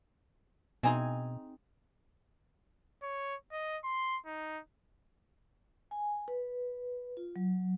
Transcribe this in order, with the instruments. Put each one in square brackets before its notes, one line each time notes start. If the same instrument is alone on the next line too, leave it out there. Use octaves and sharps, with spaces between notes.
[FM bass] B2 [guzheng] C4 D#4 G#4 [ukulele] G#5
[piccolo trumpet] C#5
D#5
C6
D#4
[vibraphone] G#5
B4
F4
F#3